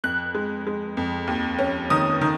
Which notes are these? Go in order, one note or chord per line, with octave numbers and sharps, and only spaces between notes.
F2 F#6
G#3
G#3
F2
D#2
C#4
D#3 D#6
D#3